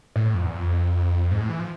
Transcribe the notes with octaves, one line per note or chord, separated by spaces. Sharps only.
A2
F2
E2
F2
G#2
A2
E3
F3